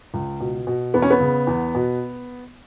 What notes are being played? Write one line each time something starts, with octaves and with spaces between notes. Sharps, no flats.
C#2
B2
B2
E2 B3
C#4
B3
C#3
E2
B2